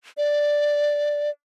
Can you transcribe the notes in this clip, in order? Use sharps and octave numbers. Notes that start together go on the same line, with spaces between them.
D5